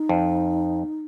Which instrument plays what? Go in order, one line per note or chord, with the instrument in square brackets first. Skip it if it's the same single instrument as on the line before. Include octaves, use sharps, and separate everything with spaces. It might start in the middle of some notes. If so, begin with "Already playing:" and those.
Already playing: [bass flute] D#4
[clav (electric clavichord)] F2